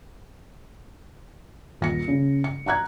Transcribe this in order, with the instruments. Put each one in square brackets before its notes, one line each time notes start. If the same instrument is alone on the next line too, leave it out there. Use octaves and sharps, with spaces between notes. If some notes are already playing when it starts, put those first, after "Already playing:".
[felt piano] D#1 A#6 C#7
C#3
C#7
F#5 A#5 F#6 G#6